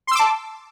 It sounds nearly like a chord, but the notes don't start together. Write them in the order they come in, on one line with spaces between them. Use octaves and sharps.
C6 E6 D6 A5